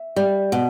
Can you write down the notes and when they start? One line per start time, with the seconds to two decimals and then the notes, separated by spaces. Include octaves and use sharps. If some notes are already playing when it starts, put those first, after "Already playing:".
Already playing: E5
0.16 G3
0.52 B2